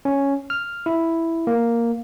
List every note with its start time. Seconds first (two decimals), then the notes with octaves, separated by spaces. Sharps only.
0.05 C#4
0.50 F6
0.86 E4
1.47 A#3